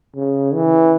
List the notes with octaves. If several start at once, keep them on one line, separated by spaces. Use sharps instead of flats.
C#3
E3